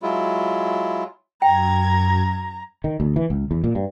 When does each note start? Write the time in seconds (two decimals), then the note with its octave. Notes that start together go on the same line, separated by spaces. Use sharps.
0.02 F#3 G#3 E4 F4
1.42 F#2 G5 A#5 G#6
2.84 D#3
3.00 D2
3.16 E3
3.30 C#2
3.51 E2
3.64 A#2
3.75 G2